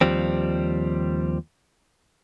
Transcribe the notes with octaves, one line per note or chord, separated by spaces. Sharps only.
D#2 F3 G3 C4